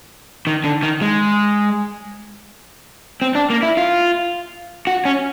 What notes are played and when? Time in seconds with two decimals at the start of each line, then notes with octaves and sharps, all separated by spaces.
0.47 D#3
0.64 D3
0.83 D#3
1.02 G#3
3.22 C4
3.35 D4
3.50 A#3
3.63 E4
3.77 F4
4.87 F#4
5.05 C#4